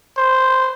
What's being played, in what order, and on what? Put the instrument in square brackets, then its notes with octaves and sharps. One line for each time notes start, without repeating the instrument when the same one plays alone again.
[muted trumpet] C5